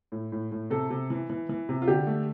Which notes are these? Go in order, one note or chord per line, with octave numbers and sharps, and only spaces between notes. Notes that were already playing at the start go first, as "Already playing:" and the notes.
A2
A2
A2
C3 A4
C3
E3
E3
E3
C3
F4
D3 G4
A3